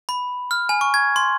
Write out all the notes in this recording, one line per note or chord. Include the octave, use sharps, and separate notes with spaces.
B5
F6
G#5
C#6
G#6
C6